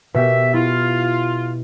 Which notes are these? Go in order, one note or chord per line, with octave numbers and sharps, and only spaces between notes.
B2 G4 E5
E4 F4